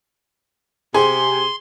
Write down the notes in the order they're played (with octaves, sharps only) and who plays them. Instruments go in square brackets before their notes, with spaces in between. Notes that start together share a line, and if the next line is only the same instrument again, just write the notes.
[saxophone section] C3 [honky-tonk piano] G#4 [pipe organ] C6